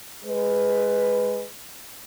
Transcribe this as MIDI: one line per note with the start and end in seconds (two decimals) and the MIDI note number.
0.24 1.44 56
0.24 1.44 71